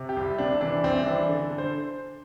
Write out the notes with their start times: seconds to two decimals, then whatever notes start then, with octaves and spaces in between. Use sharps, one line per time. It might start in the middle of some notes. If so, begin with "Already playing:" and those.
Already playing: C3
0.09 G4
0.16 C2
0.38 C3 D4
0.61 E3 D4
0.84 C2 C4
1.06 E3 D4
1.28 D3
1.51 D3
1.58 C5